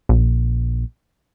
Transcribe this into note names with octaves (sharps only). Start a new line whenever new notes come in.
A#1